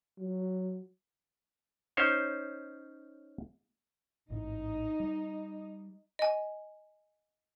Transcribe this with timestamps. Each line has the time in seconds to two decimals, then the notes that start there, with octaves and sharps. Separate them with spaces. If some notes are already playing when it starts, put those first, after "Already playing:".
0.18 F#3
1.97 C#4 D#4 C5 C#5
4.30 A1 G#2 D#4
5.00 G3
6.19 D#5 G#5